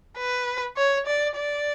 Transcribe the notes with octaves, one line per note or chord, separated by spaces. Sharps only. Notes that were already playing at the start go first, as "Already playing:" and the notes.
B4
C#5
D5
D5